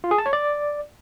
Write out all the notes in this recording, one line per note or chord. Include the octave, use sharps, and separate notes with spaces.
F4
G#4
A5
C#5
D5